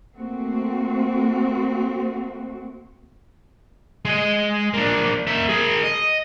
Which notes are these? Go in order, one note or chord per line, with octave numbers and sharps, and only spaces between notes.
A3 A#3 C4 F#4
G#3 D#5
A#3 D4
A#3 E5
G#4 A#4
D#5